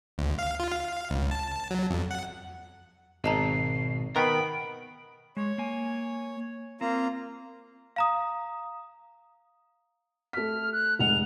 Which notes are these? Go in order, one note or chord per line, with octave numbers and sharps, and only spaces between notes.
D2
F5
F4
F5
C#2
A5
F#3
F2
F#5
G#1 B2 D#5 A5 A#5 C7
D#3 B3 A#4 B4 G5 A#5 B5 D7
G#3 C#5
A#3 G#5
A#3 C4 F4 A#5
F5 A#5 D#6
A3 F6 B6
F#6
F1 G#3 F#5 F7